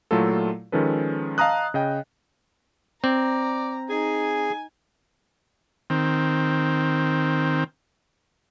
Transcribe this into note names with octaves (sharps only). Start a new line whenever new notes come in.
A#2 F#3 A3 E4 F4 A4
D#3 F3 G#3 C#4 A4 B4
D#5 F5 A5 A#5 D#6 F#6
C#3 D#5 G5
C4 D5 A#5
D#4 G#4 G#5
D#3 C4